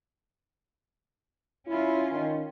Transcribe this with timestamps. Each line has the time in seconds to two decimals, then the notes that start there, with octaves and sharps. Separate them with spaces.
1.67 C#4 E4 F4
2.12 D#3